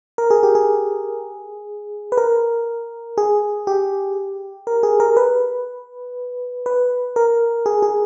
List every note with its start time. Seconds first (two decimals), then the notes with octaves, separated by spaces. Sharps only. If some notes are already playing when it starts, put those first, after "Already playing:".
0.18 A#4
0.30 G#4
0.43 G4
0.55 G#4
2.12 B4
2.17 A#4
3.18 G#4
3.67 G4
4.67 A#4
4.83 G#4
5.00 A#4
5.17 B4
6.66 B4
7.16 A#4
7.66 G#4
7.82 G#4